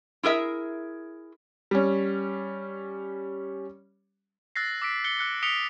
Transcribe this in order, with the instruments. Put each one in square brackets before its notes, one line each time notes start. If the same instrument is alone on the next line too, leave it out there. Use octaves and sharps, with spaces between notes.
[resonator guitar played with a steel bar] E4 G#4 A#4 E5
[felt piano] G3 C#4
[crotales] E6 F#6 A6 A#6 C7
D6 E6 B6 D7
F#6 C#7 G7
E6 F#6 C#7
D#6 B6 C#7 D7 F7 G7